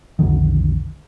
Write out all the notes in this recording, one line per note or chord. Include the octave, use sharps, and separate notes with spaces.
B1 F2 D3 D#3